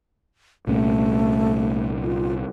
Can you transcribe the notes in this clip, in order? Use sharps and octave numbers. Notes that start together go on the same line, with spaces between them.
C2 A#2 A3 C#4
F4